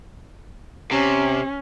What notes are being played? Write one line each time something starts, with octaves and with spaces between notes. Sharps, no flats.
C3 C#4